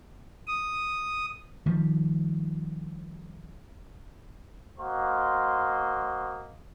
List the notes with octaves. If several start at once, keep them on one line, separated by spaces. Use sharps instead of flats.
D#6
D#3 F3 G3
A#3 F#4 C5 D#5 C6